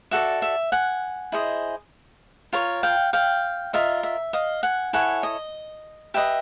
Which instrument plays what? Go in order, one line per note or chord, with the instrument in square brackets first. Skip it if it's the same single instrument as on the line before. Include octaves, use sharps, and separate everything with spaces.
[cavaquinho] F#4 A4 D5 E5
E5
F#5 G#5
E4 G#4 C5 D#5
F4 A#4 C#5
F5 G5
F5 G5
F4 A#4 D#5 E5
E5
D#5 F5
F#5 G#5
E4 A4 C#5 F#5 G#5
D#5
G4 B4 D#5 E5